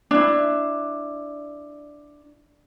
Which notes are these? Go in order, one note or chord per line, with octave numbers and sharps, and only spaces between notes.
D4 E4